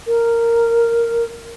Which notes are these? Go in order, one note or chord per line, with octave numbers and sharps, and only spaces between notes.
A#4